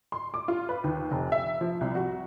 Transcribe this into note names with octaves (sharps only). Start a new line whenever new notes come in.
C6
D6
F4
B4
D#2
F1
E5
F3
C2
F#4